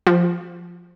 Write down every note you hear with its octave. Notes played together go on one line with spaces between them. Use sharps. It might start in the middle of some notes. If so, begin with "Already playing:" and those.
F3